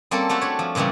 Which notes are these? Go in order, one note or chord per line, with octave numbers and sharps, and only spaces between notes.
G3 A#3 C4 C#4 A4
A3 F#4 G4 A4 E5
D4 C#5
F3
A#2 C#3 E3 G3 A3